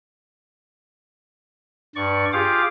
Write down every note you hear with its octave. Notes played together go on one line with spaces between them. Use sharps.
G2 D5 C#6
F4 G4 G#4 F5 D6